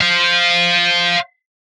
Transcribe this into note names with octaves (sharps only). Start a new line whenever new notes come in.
C5 F5